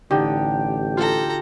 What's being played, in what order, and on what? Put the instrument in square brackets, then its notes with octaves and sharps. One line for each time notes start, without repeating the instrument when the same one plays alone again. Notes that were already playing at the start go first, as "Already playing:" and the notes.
[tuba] A1 [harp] D3 D#4 [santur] G4
[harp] F4 [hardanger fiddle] A4 A#5